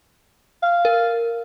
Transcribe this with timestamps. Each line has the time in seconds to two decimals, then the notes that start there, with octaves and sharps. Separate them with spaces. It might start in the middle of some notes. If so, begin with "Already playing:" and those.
0.63 F5
0.85 A#4